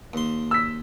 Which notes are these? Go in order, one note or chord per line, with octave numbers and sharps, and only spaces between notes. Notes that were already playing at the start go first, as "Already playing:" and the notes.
D#2 C6
E6 B6